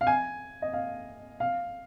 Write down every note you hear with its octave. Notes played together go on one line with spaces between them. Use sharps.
F5
G#5
D#5
F5
F5